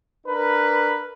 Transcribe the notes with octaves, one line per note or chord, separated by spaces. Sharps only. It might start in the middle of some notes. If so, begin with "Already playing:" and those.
D4 A#4 B4